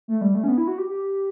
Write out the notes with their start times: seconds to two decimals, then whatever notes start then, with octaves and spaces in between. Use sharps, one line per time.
0.08 A3
0.21 G3
0.35 A3
0.43 C#4
0.48 B3
0.58 E4
0.67 F#4
0.78 G4
0.88 G4